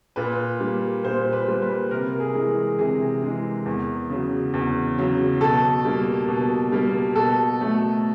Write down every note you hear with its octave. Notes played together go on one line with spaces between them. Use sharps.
A#2 B4
G3 A#3
A#2 C5
B4
G3 A#3
B4
C3 A#4
G#4
E3 G#3
C3 G#4
E3 G#3
E2
C#3 F#3
E2
C#3 F#3
B2 A4
G3 A#3
B2
G3 A#3
B2 A4
F#3 A3